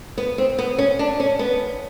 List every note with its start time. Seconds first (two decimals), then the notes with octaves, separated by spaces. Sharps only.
0.18 B3
0.38 C4
0.58 B3
0.78 C#4
0.99 D4
1.20 C#4
1.39 B3